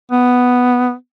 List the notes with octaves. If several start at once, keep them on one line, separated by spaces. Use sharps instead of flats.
B3